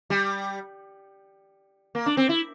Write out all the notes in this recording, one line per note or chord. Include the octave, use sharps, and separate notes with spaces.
G3
A#3
D4
C4
E4